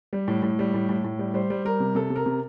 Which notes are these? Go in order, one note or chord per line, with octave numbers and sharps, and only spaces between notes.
G3
A2
A2
G3
A2
A2
A2
G3
G3 C5
G3
G3 A#4
C3
C3 A4
C3
A#4
C3